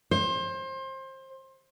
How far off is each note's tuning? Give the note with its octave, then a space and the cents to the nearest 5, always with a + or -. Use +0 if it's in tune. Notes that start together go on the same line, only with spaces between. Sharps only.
C5 +25